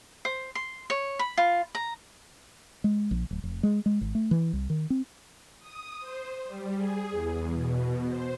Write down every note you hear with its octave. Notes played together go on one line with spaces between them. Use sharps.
C5
C6
C#5
B5
F4
A#5
G#3
A#1
D1
F1
G#3
G#3
G#1
A3
E3
C2
D#3
C4
D#6
C5
G3
G#4
E2
B2
C5